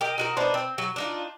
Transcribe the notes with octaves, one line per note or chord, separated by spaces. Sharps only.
G4 A#4 D#5
D#4 F#4 A#4
B3 D4 D#4 C5
C4
F#3
D4 D#4 F4